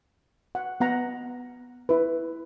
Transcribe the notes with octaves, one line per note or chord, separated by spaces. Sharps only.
F#5
B3 F#5 A#5
E4 B4